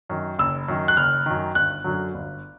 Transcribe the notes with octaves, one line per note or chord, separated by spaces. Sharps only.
F#2 D#3
F#1 E6
F#2 D#3
F#6
F#1 F6
F#2 D#3
G1 F#6
F#2 D3 F#3
G1